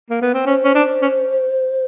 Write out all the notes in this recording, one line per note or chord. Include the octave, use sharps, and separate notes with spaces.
A#3
B3
C4
C#4 C5
C#4
D4
C#4